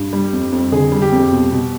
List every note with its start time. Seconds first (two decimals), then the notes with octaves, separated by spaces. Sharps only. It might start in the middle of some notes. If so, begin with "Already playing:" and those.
Already playing: G2
0.13 G3
0.33 F2
0.52 F2
0.72 D3 G#4
0.92 G3
1.02 G4
1.12 F2
1.32 B2
1.52 B2